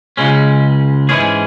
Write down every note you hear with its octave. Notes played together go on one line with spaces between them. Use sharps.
C#2 C#3 G#3 C#4
G#2 E3 G#3 C#4 G#4